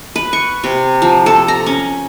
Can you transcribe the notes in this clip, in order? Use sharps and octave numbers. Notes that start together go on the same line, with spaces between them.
B4
C#6
C3
F3
A4
A#5
C#4